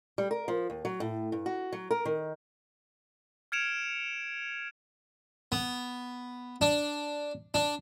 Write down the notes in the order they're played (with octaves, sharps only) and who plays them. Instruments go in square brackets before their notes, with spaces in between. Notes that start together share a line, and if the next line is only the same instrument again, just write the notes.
[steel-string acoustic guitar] G3
A#4
F3
D#2
F#3
A2
G2
F#4
F#3
A#4
D#3
[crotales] F6 G#6 C#7 D7 E7 F7
[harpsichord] B3
D4
D4